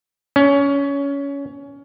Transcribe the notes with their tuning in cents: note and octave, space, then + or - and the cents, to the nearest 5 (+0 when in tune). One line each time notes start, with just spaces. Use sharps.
C#4 +20